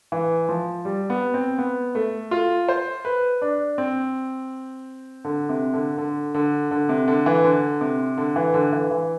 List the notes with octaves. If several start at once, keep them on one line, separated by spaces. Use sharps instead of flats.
E3
F3
G3
B3
C4
B3
A3
F4
C5
B4
D4
C4
D3
C3
D3
D3
D3
D3
C3
D3
E3
D3
C3
D3
E3
D3
E3
E3